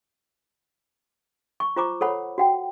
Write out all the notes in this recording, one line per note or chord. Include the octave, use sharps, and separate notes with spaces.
C#6
F4 C5 A#5 C#6 D6
A4 C5 C#5 F#5 B5
F#4 F#5 G5